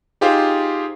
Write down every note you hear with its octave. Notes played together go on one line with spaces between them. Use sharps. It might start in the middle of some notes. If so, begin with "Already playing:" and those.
D#4 F4 G4 G#4 C5 F5